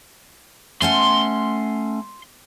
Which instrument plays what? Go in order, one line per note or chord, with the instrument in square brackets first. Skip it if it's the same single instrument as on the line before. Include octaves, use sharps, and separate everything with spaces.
[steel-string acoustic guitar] A3 C#4 F#5 [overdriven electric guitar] C6